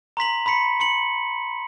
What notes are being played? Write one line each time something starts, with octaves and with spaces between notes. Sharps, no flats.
A#5 C6 B6 F#7
B5 C6 B6 C#7
C6 C#7 F#7